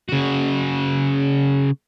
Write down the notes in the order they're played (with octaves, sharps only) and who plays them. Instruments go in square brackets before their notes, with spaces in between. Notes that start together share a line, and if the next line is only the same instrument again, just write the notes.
[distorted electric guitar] C#3 F#4